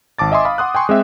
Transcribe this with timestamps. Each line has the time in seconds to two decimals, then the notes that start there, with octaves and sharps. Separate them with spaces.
0.19 G#1 A5 D6 A6
0.32 D#5 E5 G#5 C6 D#6
0.45 F5 B5
0.58 F#5 C6 D#6 F#6
0.75 G5 G#5 C6 C#6
0.89 G#3 C4 E5